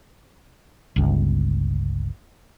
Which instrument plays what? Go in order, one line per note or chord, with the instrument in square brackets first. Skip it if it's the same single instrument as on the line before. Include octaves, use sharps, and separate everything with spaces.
[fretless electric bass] G1 C#2